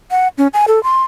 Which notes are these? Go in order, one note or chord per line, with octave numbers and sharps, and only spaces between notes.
F#5
C#4
G#5
A4
C6